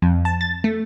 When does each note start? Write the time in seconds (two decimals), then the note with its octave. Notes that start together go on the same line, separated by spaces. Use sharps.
0.02 F2
0.25 A5
0.41 A6
0.64 A3